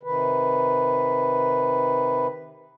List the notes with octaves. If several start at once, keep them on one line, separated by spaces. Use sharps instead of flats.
C3 D#3 B4